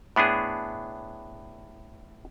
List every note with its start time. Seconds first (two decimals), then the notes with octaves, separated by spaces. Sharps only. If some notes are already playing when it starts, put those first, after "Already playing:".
0.16 A2 B3 D4 G#4